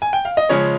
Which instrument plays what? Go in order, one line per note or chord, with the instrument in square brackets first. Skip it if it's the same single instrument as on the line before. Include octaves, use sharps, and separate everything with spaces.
[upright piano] G#5
G5
F5
D#5
C#3 F3 G#3 C#4 C#5